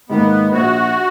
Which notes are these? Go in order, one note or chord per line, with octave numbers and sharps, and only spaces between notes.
G#2 D#3 A#3 B3
A#1 F#4